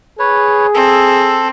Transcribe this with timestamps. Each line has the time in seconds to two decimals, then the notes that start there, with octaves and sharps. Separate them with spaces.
0.19 G#4 B4 C#5
0.74 C4 A4